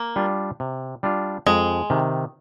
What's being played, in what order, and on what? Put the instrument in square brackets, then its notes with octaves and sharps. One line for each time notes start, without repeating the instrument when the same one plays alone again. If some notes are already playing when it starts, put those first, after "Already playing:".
Already playing: [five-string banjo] A#3
[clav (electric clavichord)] G3 D4 F4
C3
G3 D4 F4
[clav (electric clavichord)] F2 [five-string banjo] G#3
[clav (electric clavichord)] C3 D#3